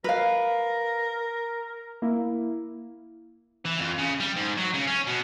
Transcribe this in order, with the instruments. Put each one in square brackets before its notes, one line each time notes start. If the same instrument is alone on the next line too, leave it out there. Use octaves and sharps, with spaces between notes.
[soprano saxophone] A#4 [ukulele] B4 F5
[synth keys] A#3 E4
[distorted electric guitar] E3
F2
C#3
G3
G#2
F#3
C#3
C#4
B2